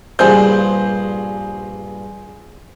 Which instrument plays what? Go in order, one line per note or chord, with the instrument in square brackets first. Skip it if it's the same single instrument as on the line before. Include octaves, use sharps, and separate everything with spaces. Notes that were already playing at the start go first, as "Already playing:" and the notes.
[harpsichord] A#1 G2 [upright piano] G#4 C5 G6